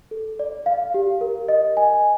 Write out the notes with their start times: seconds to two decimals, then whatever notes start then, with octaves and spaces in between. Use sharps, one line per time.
0.11 A4
0.39 D5
0.66 F5
0.94 G4
1.21 A#4
1.48 D#5
1.77 G#5